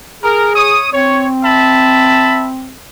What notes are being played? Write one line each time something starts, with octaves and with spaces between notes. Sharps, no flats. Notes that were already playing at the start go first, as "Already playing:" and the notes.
G#4 A#4
C#5 D#6
C4 C#5
E5 A5 B5